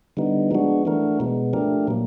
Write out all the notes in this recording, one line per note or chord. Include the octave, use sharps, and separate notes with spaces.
D3 G3 B3 D#4
F3 G#3 B3 D4 F#4
E3 A3 D4 F#4 A#4
B2 G#3 B3
F3 A3 D4 G4 A#4
A#2 F#3 A#3